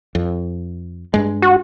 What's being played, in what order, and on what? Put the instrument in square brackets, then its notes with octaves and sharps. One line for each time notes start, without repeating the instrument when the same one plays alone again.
[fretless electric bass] F2
G2 G#3
[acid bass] F#4